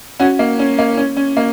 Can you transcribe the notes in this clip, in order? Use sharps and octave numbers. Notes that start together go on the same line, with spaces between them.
C#4 F#4
A#3
C#4
A#3
C#4
C#4
A#3